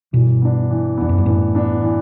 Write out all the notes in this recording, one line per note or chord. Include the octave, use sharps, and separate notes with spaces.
G2 B2 E3
B3 D4
E3
E2 B3 D4
F#2
G2
F#2 A2 E3
B3 D4
E3